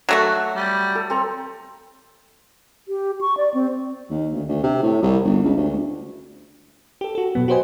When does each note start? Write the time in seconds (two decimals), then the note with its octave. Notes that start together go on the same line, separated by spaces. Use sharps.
0.09 F#3 A3 F#4
0.56 G3
0.95 A4
1.10 C4 A4 A#5
2.88 G4
3.21 C#6
3.37 D5
3.54 C4
4.10 D#2
4.33 D2
4.49 D2
4.63 C3
4.82 A2
5.03 C2
5.25 G1
5.44 C#2
5.57 D2
7.01 G4 A4
7.15 F#4 A4
7.35 B2 F#3 B3
7.48 F#4 G4 B4 C5 D#5 G#5